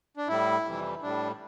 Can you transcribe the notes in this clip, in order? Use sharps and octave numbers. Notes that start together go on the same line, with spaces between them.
D4
A2 G3 E4
F2 C3 E3 G3
A2 G3 D4